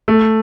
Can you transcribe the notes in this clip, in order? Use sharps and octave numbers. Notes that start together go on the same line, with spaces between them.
A3